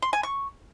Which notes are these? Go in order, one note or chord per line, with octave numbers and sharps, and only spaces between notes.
C6
G#5
C#6